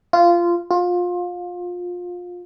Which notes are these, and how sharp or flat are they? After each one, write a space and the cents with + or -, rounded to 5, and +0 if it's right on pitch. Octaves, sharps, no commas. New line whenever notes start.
F4 -15
F4 +25